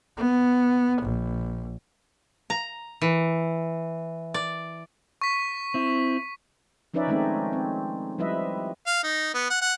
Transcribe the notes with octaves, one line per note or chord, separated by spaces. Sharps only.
B3
A#1
A#5
E3
D5
C#6 B6
C4 E4
F3 C#4 D#4 B4 D5 E5
D#3 G#3 A3 C4 C#4 D#4
C4
F3 G3 E4 B4 D#5 E5
F5
D#4
B3
F#5
F#5